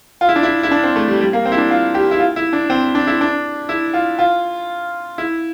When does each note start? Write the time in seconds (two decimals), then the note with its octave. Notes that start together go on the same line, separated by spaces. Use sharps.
0.21 F4
0.29 E4
0.36 D4
0.43 E4
0.63 E4
0.71 D4
0.84 C4
0.96 A3
1.08 G3
1.21 G3
1.33 A#3
1.45 C4
1.52 E4
1.58 D4
1.71 F4
1.94 G4
2.11 E4
2.20 F4
2.36 E4
2.53 D4
2.70 C4
2.95 D4
3.07 E4
3.21 D4
3.69 E4
3.94 F4
4.19 F4
5.18 E4